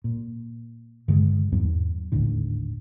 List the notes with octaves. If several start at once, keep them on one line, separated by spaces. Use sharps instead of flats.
A#2
G2 D3 D#3 G#3
E2 G#2 F#3 B3
G#1 D#2 A2 D3